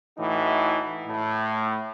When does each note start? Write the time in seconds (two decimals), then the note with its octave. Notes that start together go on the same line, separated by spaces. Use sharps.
0.17 A2 E3 D#4 F#4
1.07 A2